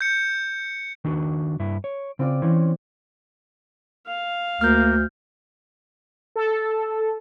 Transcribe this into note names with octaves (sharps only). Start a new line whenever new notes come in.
G6 C#7
D#3 D4 F#4
G2 E4
C#5 D7
C#3 C4 F4 D5
E3 C4 C#4
F5
D2 A#3 F6 G6
A4